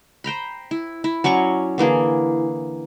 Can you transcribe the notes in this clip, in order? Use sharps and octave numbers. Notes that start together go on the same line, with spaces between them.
C5 G5 A#5 B5
E4
E4
F#3 C#4 D5 C#6
D3 E3 A#3 G#4